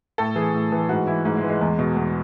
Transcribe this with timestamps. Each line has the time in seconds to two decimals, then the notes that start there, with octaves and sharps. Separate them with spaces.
0.18 A2 A4
0.35 E3 G#4
0.54 A2
0.72 E3
0.89 G#2 F#4
1.07 E3 E4
1.25 G#2
1.37 G#3
1.43 E3
1.49 G#3
1.61 E2
1.79 B2
1.97 E2